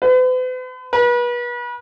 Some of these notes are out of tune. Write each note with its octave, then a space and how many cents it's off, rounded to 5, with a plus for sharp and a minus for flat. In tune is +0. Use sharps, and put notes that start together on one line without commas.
B4 +45
B4 -35